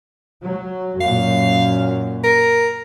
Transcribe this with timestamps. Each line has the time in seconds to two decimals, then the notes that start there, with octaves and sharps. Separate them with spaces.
0.46 F#3
1.01 F#2 A#2 F5
2.24 A#4